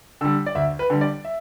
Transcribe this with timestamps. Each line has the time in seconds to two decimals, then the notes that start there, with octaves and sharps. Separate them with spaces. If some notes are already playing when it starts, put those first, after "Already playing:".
0.21 D3 G3 E6
0.46 D5
0.55 D2 E5
0.79 B4
0.90 D3 G3
1.01 D5
1.25 E5